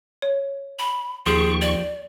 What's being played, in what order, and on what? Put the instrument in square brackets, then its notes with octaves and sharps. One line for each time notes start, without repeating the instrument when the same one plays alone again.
[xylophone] C#5
[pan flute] B5
[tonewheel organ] D#2 C#6 [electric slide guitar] F3 G4 [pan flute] G#4 [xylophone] C6
[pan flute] D5